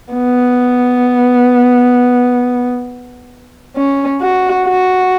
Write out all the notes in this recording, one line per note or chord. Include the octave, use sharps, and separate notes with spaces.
B3
C#4
F#4
F#4